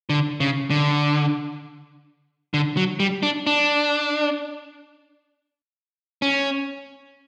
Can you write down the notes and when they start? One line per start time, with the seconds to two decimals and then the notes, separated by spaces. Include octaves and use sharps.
0.10 D3
0.40 C#3
0.70 D3
2.54 D3
2.77 F#3
3.00 G3
3.23 D4
3.47 D4
6.22 C#4